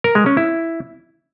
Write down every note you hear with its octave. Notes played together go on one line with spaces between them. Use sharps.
A#4
G#3
C#4
E4